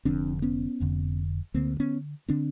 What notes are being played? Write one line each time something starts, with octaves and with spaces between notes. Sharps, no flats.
F1 F2 D3 C4 D4
B3 C#4
F1 F2 D3
D2 D3 A#3 C4
B3 C#4
D3 C4 D4